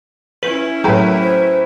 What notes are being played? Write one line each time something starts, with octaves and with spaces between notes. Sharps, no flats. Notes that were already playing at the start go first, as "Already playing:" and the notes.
C#4 E4 B4 F#7
A2 F#3 G4 A#4 B4
C5